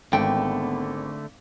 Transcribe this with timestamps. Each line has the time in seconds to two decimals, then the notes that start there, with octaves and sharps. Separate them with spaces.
0.13 G#1 D3 A3 B3 G5